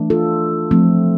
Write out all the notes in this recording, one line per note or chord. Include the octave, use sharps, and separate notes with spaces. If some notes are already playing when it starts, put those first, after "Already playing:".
Already playing: E3 A3 D4
F4 A4
F3 A3 C4